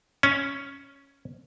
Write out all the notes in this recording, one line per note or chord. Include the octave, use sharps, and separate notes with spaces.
C#4